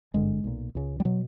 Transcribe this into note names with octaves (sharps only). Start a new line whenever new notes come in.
G#1 G2 D3 G#3
B1 A#2
C#2 C#3
G3
B2 F#3